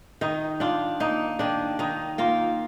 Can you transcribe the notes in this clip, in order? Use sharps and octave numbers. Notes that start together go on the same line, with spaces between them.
D#3 D#4
D4 F4
A#3 D#4
D#3 D4
D#3 D#4
A#3 F4